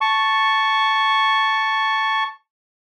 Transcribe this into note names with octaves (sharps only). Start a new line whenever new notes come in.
A5 C#6